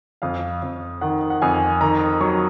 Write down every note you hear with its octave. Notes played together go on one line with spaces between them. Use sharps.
F2 F5
F2
D#3 F#5
F#5
F2 G#5
D#3 A#5
F#3 C#6